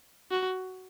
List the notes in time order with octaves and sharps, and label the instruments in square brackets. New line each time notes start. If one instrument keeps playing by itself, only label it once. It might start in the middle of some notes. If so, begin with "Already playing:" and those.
[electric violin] F#4